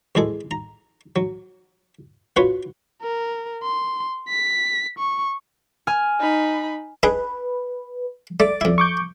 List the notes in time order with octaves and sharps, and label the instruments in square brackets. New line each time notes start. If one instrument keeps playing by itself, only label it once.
[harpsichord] E2 G#3 G#4 A4
A#5
F#3
B3 F4 F#4 B4 C#5
[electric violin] A#4
C6
B6
C#6
[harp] G#5 F6
[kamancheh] D#4 B5
[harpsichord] D4 D#4 G#4 [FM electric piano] B4
[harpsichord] A3 [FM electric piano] D5 D6
[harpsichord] F2 E4
[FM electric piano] C#6 D6 G6